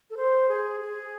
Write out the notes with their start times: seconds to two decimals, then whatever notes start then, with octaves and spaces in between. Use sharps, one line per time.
0.10 A4
0.17 C5
0.49 G#4
0.81 G#4